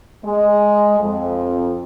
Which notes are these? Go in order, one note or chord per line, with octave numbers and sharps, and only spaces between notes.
G#3
F2